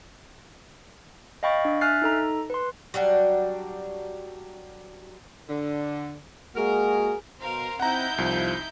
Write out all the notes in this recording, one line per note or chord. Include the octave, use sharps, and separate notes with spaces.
D#5 F5 G5 B5 C#6 A6
D4
E5 G#5 F6 F#6 A6 C7
D#4 A4 A#5
B4 C6
F#3 G3 D4 F#5
D3
G#3 A#3 F#4 G#4 A#4
B2 A#4 C5 F5
C4 D#4 E4 F#5 A#5 G6
C2 F3